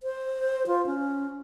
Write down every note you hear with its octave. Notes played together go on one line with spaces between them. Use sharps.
C5
F4
C#4